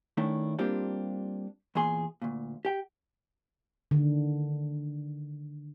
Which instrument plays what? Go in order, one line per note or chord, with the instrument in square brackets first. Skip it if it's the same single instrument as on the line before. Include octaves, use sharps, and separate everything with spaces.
[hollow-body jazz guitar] D#3 A3 C#4 D4 E4
G3 A#3 C4 D4 F4 G4
E2 A#2 G#4 C6
D2 A#2
G4 G5
[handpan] D3 D#3